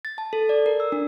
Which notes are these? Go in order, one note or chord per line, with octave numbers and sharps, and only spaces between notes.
A6
A5
A4
D5
A#4
E6
D4